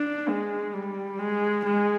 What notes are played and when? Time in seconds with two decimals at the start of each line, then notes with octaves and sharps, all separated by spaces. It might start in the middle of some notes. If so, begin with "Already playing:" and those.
Already playing: D4
0.28 G#3
0.73 G3
1.19 G#3
1.64 G#3